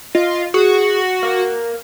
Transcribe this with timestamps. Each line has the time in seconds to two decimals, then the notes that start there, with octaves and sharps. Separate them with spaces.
0.15 F4 D#5
0.54 F#4 G#4
1.23 A#4 F5